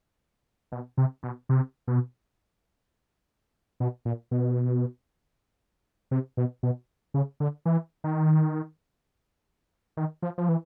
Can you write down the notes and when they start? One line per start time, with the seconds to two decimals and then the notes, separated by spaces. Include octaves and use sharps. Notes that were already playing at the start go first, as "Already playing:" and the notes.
0.72 B2
0.98 C3
1.23 B2
1.49 C3
1.88 B2
3.80 B2
4.05 A#2
4.31 B2
6.11 C3
6.37 B2
6.63 B2
7.14 C#3
7.40 D3
7.66 E3
8.04 D#3
9.97 D#3
10.22 F3
10.38 F3
10.49 E3